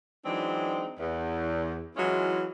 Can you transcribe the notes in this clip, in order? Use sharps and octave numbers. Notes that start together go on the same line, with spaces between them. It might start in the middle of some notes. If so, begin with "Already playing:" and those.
E3 F#3 G#3 C4 D4 D#4
E2
E3 F#3 G#3 C#4 E4 F4